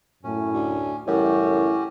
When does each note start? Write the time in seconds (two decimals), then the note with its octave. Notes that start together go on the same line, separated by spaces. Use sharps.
0.24 F#2 A2 C#4
0.54 D2
1.07 F#2 A2 C#3 E3 G3 C#4 F#4 G4